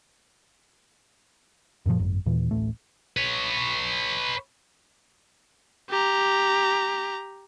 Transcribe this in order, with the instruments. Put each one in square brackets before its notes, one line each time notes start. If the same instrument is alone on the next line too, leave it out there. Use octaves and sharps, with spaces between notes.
[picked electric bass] F#2 A#2 D#3 F3
G#1 F#2
D#2 A#2 E3
D1 A1 A3
[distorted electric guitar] B4 C#5
[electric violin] G4 A#5